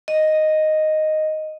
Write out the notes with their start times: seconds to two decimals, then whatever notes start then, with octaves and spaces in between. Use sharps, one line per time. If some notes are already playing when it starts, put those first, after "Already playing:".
0.08 D#5